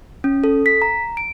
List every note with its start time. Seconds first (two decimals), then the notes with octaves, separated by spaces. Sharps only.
0.24 C#4
0.44 A4
0.66 B6
0.82 A#5
1.17 D7